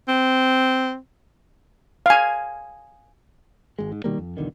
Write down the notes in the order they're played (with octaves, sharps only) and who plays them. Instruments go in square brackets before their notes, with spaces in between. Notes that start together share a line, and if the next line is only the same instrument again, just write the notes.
[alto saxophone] C4
[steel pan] F5 G#5
[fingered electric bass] G#1 G#3
G#2
B2 D#3 G3 A#3
F2
B1 E2 D3 D#3